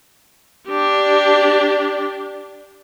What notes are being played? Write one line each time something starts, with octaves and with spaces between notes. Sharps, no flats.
D4 G4